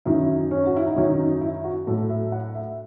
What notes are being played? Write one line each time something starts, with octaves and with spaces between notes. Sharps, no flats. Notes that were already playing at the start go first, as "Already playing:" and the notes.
F#2 D#3 F#3 E4
C#4
F#4
E4
D#4
F#2 D#3 F#3 C#4
D#4
E4
F#4
A2 F#3 A4
E5
F#5
E5